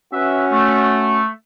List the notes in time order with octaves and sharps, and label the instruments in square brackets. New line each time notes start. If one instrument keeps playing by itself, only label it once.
[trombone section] C#4 F#4 [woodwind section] B4 E5
[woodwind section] A3